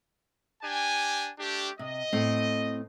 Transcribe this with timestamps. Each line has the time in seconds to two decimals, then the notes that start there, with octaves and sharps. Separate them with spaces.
0.63 D4 G4 G#5
1.40 A3 D4 G4
1.79 C3 D#5
2.12 A2 C4